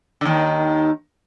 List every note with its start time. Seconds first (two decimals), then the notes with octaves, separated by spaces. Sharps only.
0.21 D3
0.25 D#2 D#3